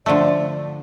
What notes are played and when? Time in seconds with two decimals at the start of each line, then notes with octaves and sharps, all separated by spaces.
0.06 D3 F3 A3 D5